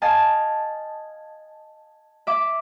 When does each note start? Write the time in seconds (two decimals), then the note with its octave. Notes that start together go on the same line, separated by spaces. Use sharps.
0.02 D#5 F5 G#5 A5
2.27 E5 D6